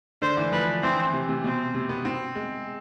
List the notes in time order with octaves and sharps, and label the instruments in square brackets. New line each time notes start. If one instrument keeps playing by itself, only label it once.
[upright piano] D3 [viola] C5
[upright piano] E3
[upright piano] F3 [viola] B4
[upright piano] E3 [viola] C4
[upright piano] C3
C3
[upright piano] B2 [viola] C4
[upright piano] C3
B3
C4
G#3